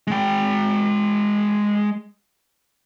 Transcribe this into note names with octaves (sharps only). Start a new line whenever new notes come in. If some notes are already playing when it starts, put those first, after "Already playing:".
G#3 G5